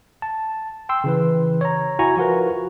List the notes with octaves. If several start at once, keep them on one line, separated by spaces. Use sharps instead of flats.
A5
G5 C6 E6
C#3 E3 B4
C#5 A#5
E4 F#4 G#5 A#5 C#6
F3 F4 F#4 A#4 B4